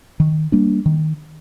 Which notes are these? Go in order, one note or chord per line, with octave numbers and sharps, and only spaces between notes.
D#3
G3 A#3 D4
D#3